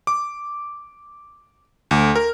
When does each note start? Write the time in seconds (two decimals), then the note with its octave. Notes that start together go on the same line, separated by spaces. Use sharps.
0.07 D6
1.91 D2
2.15 A#4